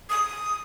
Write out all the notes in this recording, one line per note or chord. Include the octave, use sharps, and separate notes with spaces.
D#6